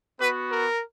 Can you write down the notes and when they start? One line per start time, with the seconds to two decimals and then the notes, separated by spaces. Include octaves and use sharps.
0.19 B3 F#4 B4
0.52 A#4